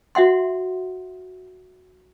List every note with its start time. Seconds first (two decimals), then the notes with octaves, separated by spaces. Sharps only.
0.15 F#4 E5 F#5 C6